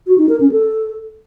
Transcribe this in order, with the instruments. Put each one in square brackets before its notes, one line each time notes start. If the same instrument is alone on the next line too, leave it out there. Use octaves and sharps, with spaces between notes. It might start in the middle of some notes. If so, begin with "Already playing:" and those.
[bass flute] F#4
D#4
A#4
C#4
A4